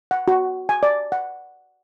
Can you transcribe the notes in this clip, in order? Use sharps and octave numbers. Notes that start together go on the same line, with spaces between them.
F#5
F#4
G#5
D5
F#5